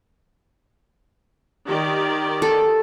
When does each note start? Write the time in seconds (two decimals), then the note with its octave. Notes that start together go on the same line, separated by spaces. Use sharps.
1.67 D#3 G4 D5
2.42 A4